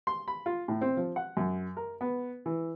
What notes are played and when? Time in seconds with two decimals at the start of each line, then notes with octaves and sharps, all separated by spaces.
0.07 C6
0.28 B5
0.46 F4
0.68 A2
0.81 C4
0.97 F3
1.16 F#5
1.37 F#2
1.77 A#4
2.01 B3
2.46 E3